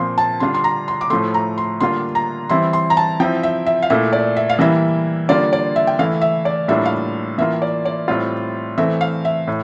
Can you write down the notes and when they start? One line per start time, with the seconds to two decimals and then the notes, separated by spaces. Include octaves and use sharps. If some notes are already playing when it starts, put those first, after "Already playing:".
Already playing: A#2 F3 C4 C6
0.18 A5
0.40 D3 G3 D4 F4 C6
0.54 C6
0.64 A#5
0.88 C6
1.01 D6
1.10 A2 F3 A3 C6
1.34 A#5
1.58 C6
1.80 D3 G3 A#3 D4 F4 C6
2.15 A#5
2.50 E3 G3 C4 E4 C6
2.73 C6
2.90 A#5
2.97 A5
3.20 F3 C4 E4 G5
3.43 E5
3.66 E5
3.82 F5
3.90 A#2 A3 E4 E5
4.13 D5
4.36 E5
4.50 F5
4.59 E3 G3 A#3 E4 E5
5.29 D3 G3 A#3 F4 D5
5.53 D5
5.76 E5
5.87 G5
5.99 E3 A3 E4 F5
6.22 E5
6.45 D5
6.68 A2 G3 A#3 D4 F4 E5
6.85 F5
7.38 E3 A#3 F4 E5
7.62 D5
7.85 D5
8.08 A2 G3 C4 F4
8.78 E3 A3 C4 E5
9.01 F5
9.25 E5
9.47 A2